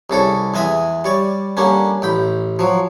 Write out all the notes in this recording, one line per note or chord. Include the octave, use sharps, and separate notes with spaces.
C2 C#3 A4 C#5
E2 G#3 D#5 E5 D#6
G3 C#5 D5
D3 G3 A#3 C#4
A1 G5 B5
F3 F#3